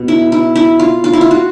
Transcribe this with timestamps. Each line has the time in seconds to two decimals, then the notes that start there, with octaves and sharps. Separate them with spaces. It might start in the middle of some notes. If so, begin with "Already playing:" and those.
Already playing: B2
0.08 E4
0.32 E4
0.56 E4
0.79 F4
1.04 F4
1.13 E4
1.21 F4
1.31 F#4